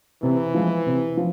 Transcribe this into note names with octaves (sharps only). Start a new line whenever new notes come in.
C3 E3
F3 G#3 B3
C3
F3